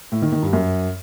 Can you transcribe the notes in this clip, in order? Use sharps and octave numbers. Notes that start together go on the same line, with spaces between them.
A2
D#3
D#3
G2
F#2